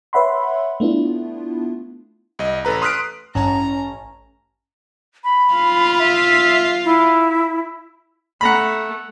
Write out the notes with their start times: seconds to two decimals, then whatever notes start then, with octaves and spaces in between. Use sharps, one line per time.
0.13 B4 C#5 E5 F#5 B5 C6
0.80 A3 B3 D4 E4 F4
2.39 C2 D#5
2.65 A1 A4 B4 A#5
2.82 C6 D#6 F6 F#6 B6 D7
3.35 A1 G2 D#3 C#4 C#5 F#5 A5 A#5
5.24 B5
5.54 F4
5.99 E5
6.84 E4
8.41 A3 F#5 A#5 B5